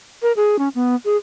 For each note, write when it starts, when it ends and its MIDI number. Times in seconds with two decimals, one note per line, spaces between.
0.22 0.32 70
0.36 0.59 68
0.59 0.68 61
0.75 0.95 59
1.05 1.16 68